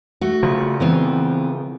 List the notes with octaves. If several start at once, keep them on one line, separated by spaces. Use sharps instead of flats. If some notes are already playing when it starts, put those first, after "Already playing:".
A3 F#4
C#3 F3
E3 B3 C4